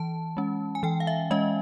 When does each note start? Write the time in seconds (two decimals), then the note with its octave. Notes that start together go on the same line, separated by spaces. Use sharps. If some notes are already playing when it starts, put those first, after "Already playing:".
Already playing: E3 A5
0.37 G#3 C#4
0.75 G#5
0.83 E3 G5
1.00 F5
1.07 E5
1.31 G#3 C#4 D#5